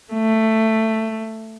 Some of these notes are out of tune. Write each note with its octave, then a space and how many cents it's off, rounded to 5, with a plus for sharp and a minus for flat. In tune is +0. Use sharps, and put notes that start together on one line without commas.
A3 +10